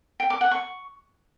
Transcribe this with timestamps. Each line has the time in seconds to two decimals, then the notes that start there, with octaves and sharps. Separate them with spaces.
0.20 G5
0.30 D6
0.41 F#5
0.51 C#6